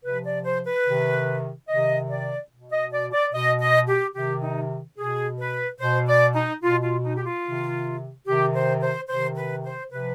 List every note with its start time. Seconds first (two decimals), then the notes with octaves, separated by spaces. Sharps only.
0.04 C3 F3 B4
0.25 D5
0.45 C5
0.66 B4
0.86 C3 D#3
1.68 C3 D#3 D#5
2.10 D5
2.50 B2
2.71 D#5
2.92 D5
3.12 D5
3.33 B2 D#5
3.60 D#5
3.88 G4
4.15 C3 D#3 G4
4.42 D#4
4.98 B2 G#4
5.39 B4
5.80 B2 C5
6.07 D5
6.35 D#4
6.62 B2 F4
6.83 F4
7.04 D#4
7.17 G4
7.24 F4
7.44 C3 D#3
8.27 C3 D#3 G4
8.54 C5
8.81 C5
9.09 C3 D#3 C5
9.36 B4
9.64 C5
9.91 C3 F3 B4